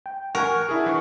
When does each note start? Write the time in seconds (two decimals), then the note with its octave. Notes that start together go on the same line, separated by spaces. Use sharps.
0.06 G5
0.35 A#4 F#5 G#5 C#6
0.69 D4 E4 G#4
0.86 E3 C#6